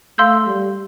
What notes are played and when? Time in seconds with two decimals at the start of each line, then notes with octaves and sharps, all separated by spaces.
0.18 A3 F5 C6 E6 G6
0.46 G3